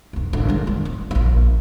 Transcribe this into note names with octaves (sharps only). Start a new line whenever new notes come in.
B1 F2
G#1 D3
D#3 G#3
F2
B3
D1 A#1